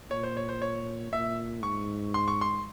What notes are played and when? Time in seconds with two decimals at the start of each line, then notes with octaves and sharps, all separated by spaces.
0.11 A#2 C#5
0.23 C5
0.37 C#5
0.49 C5
0.62 C#5
1.12 A#2 E5
1.63 G#2 C#6
2.14 C6
2.28 C#6
2.41 C6